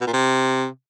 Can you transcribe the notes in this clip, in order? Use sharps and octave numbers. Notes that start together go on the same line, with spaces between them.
B2
A#2
C3